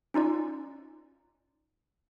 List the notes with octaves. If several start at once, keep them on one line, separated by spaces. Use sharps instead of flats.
C#4 D#4 F4 D5